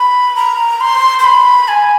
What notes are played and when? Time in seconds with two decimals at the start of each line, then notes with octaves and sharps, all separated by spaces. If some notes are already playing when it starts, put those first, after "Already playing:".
Already playing: B5
0.36 A#5
0.81 C6
1.19 C6
1.24 B5
1.68 G#5